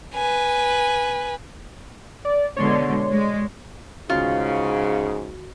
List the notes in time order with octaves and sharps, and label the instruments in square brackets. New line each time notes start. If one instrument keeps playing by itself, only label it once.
[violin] B4 G#5
[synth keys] D5
[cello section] B2 D3 G#3 [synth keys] C#5 D5 C6
[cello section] G#3
[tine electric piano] G#1 D2 F#4 [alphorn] G#2 [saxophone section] C#3 [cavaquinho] F4